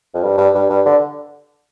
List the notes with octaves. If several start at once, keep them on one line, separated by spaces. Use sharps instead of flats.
F2
G2
G2
G2
G2
D3